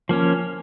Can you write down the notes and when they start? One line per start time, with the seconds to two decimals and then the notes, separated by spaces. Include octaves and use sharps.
0.09 F3 A#3 C#4